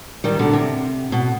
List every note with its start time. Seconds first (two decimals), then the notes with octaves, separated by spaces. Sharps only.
0.24 D#3 G3
0.39 B2 D3
0.53 C3
1.12 B2